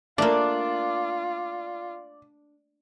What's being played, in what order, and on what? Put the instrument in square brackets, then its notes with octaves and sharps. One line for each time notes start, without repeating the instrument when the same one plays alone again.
[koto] A3 A#3 [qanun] D4 [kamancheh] F4 [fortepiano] D5